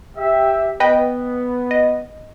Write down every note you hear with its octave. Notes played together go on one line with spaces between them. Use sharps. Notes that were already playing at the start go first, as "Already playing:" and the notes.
G4 E5
B3 B4 D#5 G5
D#5